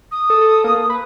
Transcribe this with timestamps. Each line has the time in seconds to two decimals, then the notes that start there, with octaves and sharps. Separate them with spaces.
0.11 D#6
0.30 A4
0.41 A4
0.64 A#3
0.90 B4